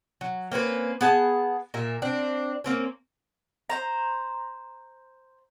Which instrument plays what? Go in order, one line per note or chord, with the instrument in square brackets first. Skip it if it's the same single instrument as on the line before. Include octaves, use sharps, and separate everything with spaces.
[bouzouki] F#3
A#3 C4 C#4 B4
B3 G#4 A5
A#2 A#4 E5
C4 D4
A#3 C4 C#4
[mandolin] C5 A#5